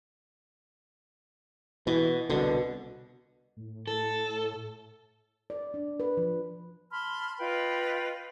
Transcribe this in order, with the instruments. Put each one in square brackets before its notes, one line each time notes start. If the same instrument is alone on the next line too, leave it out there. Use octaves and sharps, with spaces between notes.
[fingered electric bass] B2 [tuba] E3
[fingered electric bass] C2 D3 [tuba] B2
[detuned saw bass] A2
[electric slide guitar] A4
[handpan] D5
D4
B4
F3
[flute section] A5 B5 C6 F6
F4 B4 D#5 G5